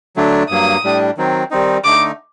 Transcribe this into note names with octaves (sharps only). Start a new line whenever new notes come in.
D3 F#3 A3 D4
G2 F#3 A#3 D#6
A2 G3 D4
D#3 F#3 C4
D#3 G3 C4 D#4
D3 A3 D#4 D6